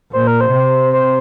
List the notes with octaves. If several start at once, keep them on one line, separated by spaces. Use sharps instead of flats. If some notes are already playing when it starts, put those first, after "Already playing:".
A#2 C5
A#4
C5
C3
C5